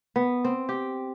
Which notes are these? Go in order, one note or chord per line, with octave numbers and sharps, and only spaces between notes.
B3
C4
G4